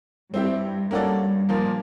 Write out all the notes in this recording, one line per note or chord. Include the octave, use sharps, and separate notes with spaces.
G2 C4 E4 G4
G2 A#3 C#4 F#4 A4 D5
A#2 F3 A#3